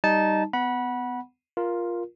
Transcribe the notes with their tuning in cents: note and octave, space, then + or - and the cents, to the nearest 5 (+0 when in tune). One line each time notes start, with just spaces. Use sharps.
G3 +0 D#4 +0 A5 -15
B3 +25 F#5 +0 B5 -25
F4 +0 A#4 +10